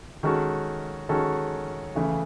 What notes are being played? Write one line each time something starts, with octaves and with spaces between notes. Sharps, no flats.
D#3 G#3 C#4 F#4 A4
D#3 G#3 C#4 F#4 A4
C#3 E3 A3